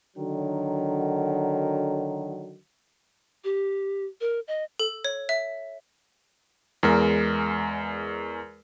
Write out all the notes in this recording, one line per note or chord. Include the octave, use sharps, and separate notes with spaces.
D3 D#3 F#3
G4
A#4
D#5
A4
C#5
E5
E2 G#3 A#4